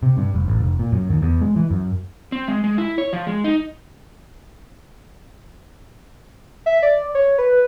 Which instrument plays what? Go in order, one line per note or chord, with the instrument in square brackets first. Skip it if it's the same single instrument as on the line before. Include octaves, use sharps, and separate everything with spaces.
[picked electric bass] C3
G2
F1
A1
F1
A#2
F#2
D#2
E2
G#3
E3
F#2
[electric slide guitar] C4
G#3
G#3
E4
C#5
F3
G#3
D#4
[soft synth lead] E5
D5
C#5
B4